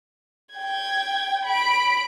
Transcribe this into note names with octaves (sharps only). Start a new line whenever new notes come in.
G5 G#6
B5 D7